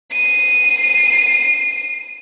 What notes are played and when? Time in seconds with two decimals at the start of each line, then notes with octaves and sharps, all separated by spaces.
0.11 C7 D#7